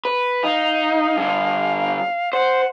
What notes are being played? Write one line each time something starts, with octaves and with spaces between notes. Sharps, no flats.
B4
D#4 F5
G2 D3
C5 F#5